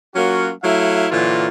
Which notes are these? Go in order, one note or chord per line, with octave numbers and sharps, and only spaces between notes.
F#3 A#3 C#4 F4 F#4
F#3 A3 E4 E5 F5
A#2 D3 E3 F#3 F4